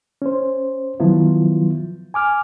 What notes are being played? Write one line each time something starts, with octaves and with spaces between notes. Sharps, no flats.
C#4 C5
D#3 F3 F#3 B3 E4 F4
G#5 D6 F6